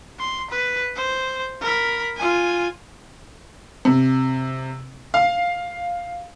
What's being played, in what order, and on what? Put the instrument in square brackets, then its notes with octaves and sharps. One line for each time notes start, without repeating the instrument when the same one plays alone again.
[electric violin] C6
B4
C5
A#4 B5
F4 G#5
[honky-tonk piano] C3
F5